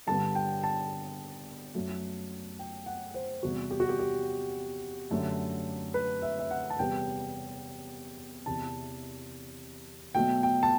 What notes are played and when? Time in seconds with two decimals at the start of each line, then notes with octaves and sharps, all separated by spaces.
0.07 G2 D3 G3 B3 A5
0.35 G5
0.64 A5
1.75 F#2 F#3 A3
2.59 G5
2.86 F#5
3.14 C5
3.43 E2 C3 G3 F#4
3.71 G4
3.80 F#4
3.89 G4
3.99 G4
5.11 F#2 D3 A3
5.94 B4
6.22 E5
6.39 E5
6.51 F#5
6.70 A5
6.78 E2 C3 G3 B3 G5
8.46 E2 C3 E3 A5
10.15 B2 F#3 A3 G5
10.43 G5
10.63 A5